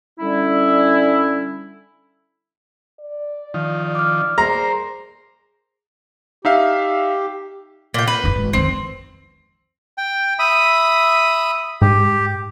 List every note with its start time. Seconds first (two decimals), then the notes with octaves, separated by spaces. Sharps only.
0.19 D3 G3 C#4 E4
3.00 D5
3.54 D#3 F3
3.95 D6 F6
4.38 G#4 A#4 C5 A#5
6.45 D#4 G4 E5 F5
7.94 A#2 G5
8.08 B4
8.24 F#1 C4
8.35 G#1
8.53 F2 D#3 C4
9.98 G5
10.39 E5 B5 D#6
11.82 G#2 G4